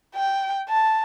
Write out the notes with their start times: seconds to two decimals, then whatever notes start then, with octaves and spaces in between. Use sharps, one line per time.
0.15 G5
0.69 A5